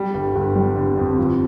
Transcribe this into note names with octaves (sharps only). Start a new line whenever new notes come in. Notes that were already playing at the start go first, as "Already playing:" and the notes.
Already playing: G3
G1
G1
G3
D3
F2
F3